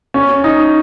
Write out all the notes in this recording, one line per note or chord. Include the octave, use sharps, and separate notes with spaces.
C#4
D#4